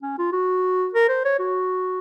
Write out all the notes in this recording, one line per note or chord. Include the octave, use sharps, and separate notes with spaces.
C#4
F4
F#4
A#4
C5
C#5
F#4